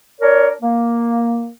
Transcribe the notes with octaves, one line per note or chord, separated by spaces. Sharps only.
D4 A#4 C#5
A#3